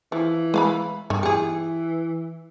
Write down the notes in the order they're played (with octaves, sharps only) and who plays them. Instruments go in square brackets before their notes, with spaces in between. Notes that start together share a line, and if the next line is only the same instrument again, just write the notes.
[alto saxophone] E3 [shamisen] F3
[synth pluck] G#3 [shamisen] B4 F5 B5
[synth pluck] G2 [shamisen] D#3
[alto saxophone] E3 [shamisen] G4 G#4 [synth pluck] C#7